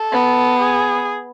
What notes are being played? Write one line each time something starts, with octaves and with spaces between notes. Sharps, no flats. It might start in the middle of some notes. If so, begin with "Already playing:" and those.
Already playing: A4
B3
G#4